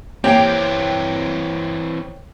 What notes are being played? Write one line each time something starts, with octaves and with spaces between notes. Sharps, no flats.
E3 A#3 C4 G4 C#5 G5